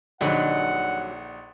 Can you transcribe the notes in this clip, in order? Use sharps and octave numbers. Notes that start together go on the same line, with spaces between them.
A#1 D3 F#3 G3 D#4 F#5